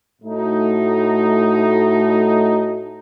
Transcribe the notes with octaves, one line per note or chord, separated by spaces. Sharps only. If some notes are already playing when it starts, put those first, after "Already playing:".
A2 A3 D#4 F#4